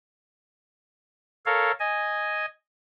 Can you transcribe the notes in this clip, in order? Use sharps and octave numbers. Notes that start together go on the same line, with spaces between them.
A4 A#4 C#5 F5
D#5 G#5